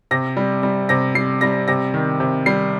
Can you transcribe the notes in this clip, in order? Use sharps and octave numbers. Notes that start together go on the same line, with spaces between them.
C3 A#6
G3
G3
C3 A#6
G3 C7
G3 A#6
C3 A#6
D#3
C3
G3 C7